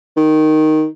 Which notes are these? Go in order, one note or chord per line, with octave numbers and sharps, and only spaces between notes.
D#3